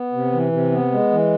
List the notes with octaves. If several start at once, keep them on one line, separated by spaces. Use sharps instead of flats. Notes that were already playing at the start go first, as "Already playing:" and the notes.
Already playing: B3
C3
E3
C3
B3
G#3
E3